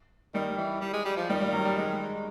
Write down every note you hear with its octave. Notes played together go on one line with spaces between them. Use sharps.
D#3 G3
E3
G3
G#3
G3
F3
D#3 G3
G3
F#3
G3
G#3